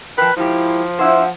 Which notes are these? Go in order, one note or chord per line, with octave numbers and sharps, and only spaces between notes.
F3 A#4 B4 G5
G#2 F3 A#3 E4 G4
D4 E4 C5 F#5